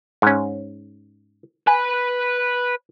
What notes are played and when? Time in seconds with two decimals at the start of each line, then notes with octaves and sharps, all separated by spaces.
0.22 G#2 C#4
1.67 B4 G#5 B5